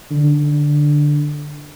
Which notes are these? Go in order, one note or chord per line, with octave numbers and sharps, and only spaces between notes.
D3
D3